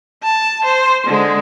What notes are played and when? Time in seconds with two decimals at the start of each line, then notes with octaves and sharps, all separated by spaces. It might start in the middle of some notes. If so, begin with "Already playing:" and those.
0.23 A5
0.64 C5
1.07 D3 G#3